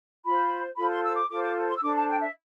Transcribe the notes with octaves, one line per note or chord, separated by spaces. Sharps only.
F4 C5 B5
F4 A4 C5 B5
C6
E6
D6
F4 A4 C5 D6
D6
C6
E6
D4 A4 C5 D6
A5
G5
E5